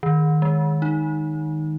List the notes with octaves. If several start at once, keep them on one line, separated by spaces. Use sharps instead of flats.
D#3
G#3
D#4